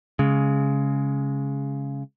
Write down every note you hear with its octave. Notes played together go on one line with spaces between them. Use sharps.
C#3 G#3